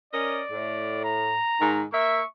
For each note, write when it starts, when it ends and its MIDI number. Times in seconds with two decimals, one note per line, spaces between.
0.13 0.42 61
0.13 0.42 70
0.13 1.01 74
0.13 0.42 75
0.51 1.37 45
1.04 1.84 82
1.61 1.84 44
1.61 1.84 51
1.93 2.21 58
1.93 2.21 76
1.93 2.27 85